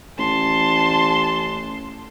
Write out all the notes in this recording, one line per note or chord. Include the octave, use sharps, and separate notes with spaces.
A1 A5 C6